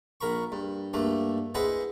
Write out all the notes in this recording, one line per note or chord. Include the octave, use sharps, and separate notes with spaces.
A#1 A#4 B5 C#6
G2
G2 A3 A#3
E4 G#4 B4 C5 D#5 F#5